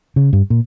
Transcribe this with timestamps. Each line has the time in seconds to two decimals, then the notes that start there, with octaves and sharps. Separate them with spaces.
0.16 C#3
0.33 G2
0.50 A#2